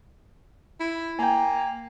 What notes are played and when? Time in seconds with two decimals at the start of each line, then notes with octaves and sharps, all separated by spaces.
0.80 E4
1.19 A#3 G5 G#5